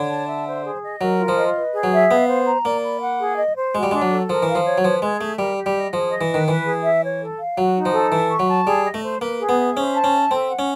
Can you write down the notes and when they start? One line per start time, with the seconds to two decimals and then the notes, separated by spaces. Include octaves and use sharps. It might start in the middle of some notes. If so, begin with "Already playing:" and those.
Already playing: D3 C#5
0.10 A5
0.28 E5
0.46 C5
0.64 G#4
0.83 D#5
1.01 F#3 A#4
1.19 F4
1.28 F3
1.38 D#5
1.56 B4
1.74 G#4
1.83 F#3
1.92 E5
2.11 B3 F5
2.28 C5
2.47 A#5
2.65 A#3 D5
2.84 B5
3.01 F#5
3.20 G#4
3.38 D#5
3.56 C5
3.75 G#3 F#4
3.83 G3
3.91 G#3 D4
4.02 F#3
4.11 A4
4.30 F3 A#4
4.43 E3
4.48 F5
4.55 F3
4.66 C#5
4.78 F#3
4.84 F3 B4
5.02 G#3 G#4
5.20 A3 E5
5.39 G3 A#4
5.57 G4
5.66 G3
5.76 D#5
5.93 F3 G#4
6.11 D#5
6.21 E3
6.30 D#3 B4
6.48 E3 B4
6.66 G#4
6.84 E5
7.03 C#5
7.21 A4
7.39 F5
7.57 F#3 F#4
7.76 D#4
7.85 F3
7.93 A4
8.12 E3 E5
8.31 C#6
8.39 F#3
8.49 A5
8.67 G3 G#4
8.85 D#5
8.94 A3
9.03 C5
9.21 A#3 B4
9.40 G#4
9.49 B3
9.59 E5
9.76 C#4 C5
9.94 A5
10.04 C#4
10.13 E5
10.31 C4 A4
10.49 F#5
10.59 C#4